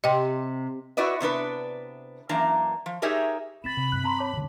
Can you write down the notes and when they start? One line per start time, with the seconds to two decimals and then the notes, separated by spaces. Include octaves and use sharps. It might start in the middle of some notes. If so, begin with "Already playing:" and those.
0.04 C3 D#5 G5
0.97 E4 F#4 B4 D5 D#5
1.21 C3 B3 D4 B4
2.29 F#2 E3 A#3 D4 A#5
2.86 F3
3.02 D#4 G4 G#4 A#4 C#5 E5
3.64 C4 D4 B5 A6 B6 E7
3.77 C3
3.92 G2 D#3 F#6
4.04 C4 A5 A#5 C6
4.19 C#5 A5 D6
4.33 D#1 D2 D3